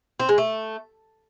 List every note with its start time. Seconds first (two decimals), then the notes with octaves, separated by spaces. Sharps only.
0.20 C4
0.29 G#3
0.38 A3